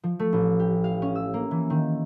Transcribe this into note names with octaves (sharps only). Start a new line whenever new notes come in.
F3
A3
A1
G4
F5
C#4
E6
A#3
E3
D#3